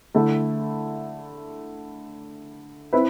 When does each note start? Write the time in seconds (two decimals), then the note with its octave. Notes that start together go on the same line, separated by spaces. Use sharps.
0.15 D3 A3 E4
2.93 C4 E4 B4